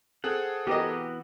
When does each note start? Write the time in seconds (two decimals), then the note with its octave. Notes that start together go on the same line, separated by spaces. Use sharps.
0.24 C4 G#4 A4 F#5
0.67 E3 B3 F#4 G4 A#4 D#5